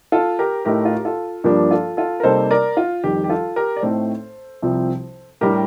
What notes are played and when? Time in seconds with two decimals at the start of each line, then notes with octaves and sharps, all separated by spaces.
0.12 F4 A4
0.39 G4 A#4
0.65 A2 A3 D#4 G4 A#4
0.85 F4
0.95 G4
1.05 F4 A4
1.44 G2 F3 A#3 D4 G4
1.71 F4 A4
1.97 F4 A4
2.20 A#4
2.23 C3 G3 A#3 D#4 A4 C5
2.51 A#4 D5
2.77 F4
3.04 F2 D#3 G3 G4
3.24 G4
3.30 F4 A4
3.56 G4 A#4
3.76 D5
3.82 A2 A3 C4 D#4 A4 C5
4.62 C2 C3 F3 C4
5.41 A2 G3 D4 G4 A#4